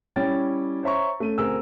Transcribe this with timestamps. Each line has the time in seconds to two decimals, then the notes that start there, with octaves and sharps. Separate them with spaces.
0.16 G3 C#4 E4 C#5 G5 A6
0.83 C5 C#5 E5 A#5 C#6
1.20 A3 C#4 D#7
1.38 D2 C4 G#4 A#4 E6